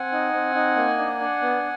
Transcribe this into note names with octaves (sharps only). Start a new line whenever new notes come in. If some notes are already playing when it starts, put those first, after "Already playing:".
Already playing: C4 F#5 G#5
D#4
C4
D#4
A#3
D4
D4
B3